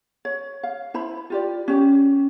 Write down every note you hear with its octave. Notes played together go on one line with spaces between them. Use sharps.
C#5
F5
E4 C5 B5
F4 G4 D5
C#4 G4